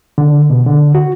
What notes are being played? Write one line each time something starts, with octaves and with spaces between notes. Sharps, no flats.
D3
B2
D3
F#4